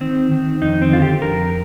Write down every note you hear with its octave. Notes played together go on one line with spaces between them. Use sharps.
D#3 C4
D#3
F2 D#4
C4
D3 F4
G4
F2 A#4